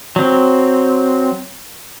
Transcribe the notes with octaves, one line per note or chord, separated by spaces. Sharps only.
F#3 C4